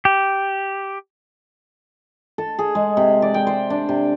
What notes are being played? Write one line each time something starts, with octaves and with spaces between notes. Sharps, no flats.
G4
A4
G#4
G#3
C3
D5
G5
C5
D4
C3